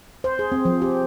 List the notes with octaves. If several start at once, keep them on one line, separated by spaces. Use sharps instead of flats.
C5
G#4
C4
F3
G4